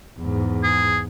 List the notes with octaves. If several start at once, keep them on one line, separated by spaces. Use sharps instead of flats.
E2 G#2
G#4